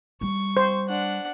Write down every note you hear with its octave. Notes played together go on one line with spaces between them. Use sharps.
G3 C#6
C5
D4 F#5